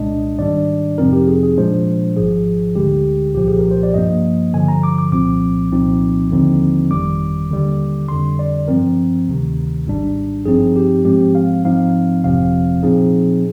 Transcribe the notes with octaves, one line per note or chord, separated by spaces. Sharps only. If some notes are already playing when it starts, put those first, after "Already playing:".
Already playing: C2 A#2 G#3 D4 D#5
G#2 D#3 G3 D4 D5
F2 C3 F3 C4 D#4 A#4
G4
G#4
G#4
A#2 F3 G#3 D4 C5
G#1 G#2 F3 G#4
D2 D3 G#3 G4
C2 A#2 F3 G4
G#4
A#4
C5
D5
G2 F3 A#3 D#5
G2 D3 F3 G#5
A#5
D6
D6
C2 A#2 F3 C4 D6
C2 A#2 F3 C4 D#4
D#2 D3 F3 C4 D#4
G1 F2 D#3 G3 D6
D#2 D3 G3
F2 D3 G3 C6
D5
G2 F3 C4 A#4
D2 C3 D#3
G#1 G#2 G3 D4
G2 F3 C4 D#4 G#4
G4
G#2 F3 G#3 C4 G4
F5
G#2 F3 C4 D#4 F5
G1 F2 C3 F3 C4 F5
A#2 F3 C4 D#4 G#4